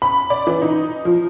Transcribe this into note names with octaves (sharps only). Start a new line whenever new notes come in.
B5
D5
E3
D#4
F3